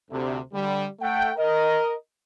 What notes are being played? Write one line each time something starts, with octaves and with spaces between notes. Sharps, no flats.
D2 C3
D3 G3
A3 F#5 G5
A#4 D#5